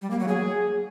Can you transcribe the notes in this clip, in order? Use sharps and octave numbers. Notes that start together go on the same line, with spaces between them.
G3
A#3
F#3
G#4